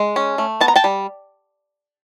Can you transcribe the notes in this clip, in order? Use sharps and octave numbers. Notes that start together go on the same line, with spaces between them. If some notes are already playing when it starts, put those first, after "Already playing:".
Already playing: G#3
C#4
A3
B3 A5
A#5
G5 A5
G3